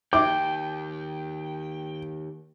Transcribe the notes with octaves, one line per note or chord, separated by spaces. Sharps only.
D#2 G5 D6